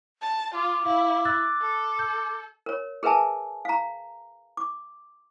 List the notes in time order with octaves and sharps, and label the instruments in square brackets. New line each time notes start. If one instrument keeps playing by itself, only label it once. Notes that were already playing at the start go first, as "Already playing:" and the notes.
[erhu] A5
[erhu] F4 [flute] D6
[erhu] E4 [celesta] F5
[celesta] E6 F#6 A6
[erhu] A4
[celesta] G6
[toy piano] A#4 C#5
G#4 A#4 B4 E5 G#5 A5
F5 A#5
D6